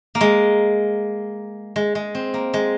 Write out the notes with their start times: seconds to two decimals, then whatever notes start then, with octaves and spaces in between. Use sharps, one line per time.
0.15 A#3
0.21 G#3
1.76 G#3
1.95 G#3
2.15 C4
2.34 A#3
2.54 G#3